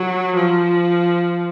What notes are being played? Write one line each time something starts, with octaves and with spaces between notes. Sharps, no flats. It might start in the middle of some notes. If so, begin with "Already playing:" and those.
Already playing: F#3
F3